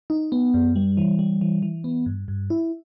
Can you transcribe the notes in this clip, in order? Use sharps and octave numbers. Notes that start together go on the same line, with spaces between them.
D#4
B3
F#2
G3
E3
G3
E3
E3
B3
G2
G2
E4